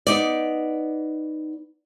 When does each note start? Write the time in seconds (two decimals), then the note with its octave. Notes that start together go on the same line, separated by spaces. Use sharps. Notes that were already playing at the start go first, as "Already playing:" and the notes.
0.07 B3 D#4 D5